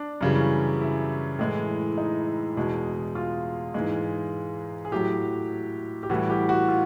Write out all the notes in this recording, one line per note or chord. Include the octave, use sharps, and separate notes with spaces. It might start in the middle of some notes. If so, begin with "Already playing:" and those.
Already playing: D4
F#2 C#3 E3 G3
E4
A2 E3 G#3
D#4
E2 B2 G#3
F4
G#2 E3 G#3
G#4
A2 F#3 G4
G4
A2 E3 G3 F#4
G4
F#4
F4